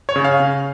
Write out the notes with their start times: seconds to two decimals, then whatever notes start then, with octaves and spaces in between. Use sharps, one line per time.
0.09 C#5
0.16 C#3
0.24 F5
0.40 C#3